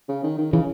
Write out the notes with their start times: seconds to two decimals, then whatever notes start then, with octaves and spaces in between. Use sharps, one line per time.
0.08 C#3
0.23 D#3
0.38 D#3
0.52 C#3 E3